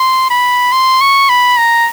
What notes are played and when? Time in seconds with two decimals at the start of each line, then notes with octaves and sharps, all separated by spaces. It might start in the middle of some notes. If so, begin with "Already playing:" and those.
Already playing: C6
0.30 B5
0.73 C6
1.01 C#6
1.29 B5
1.58 A#5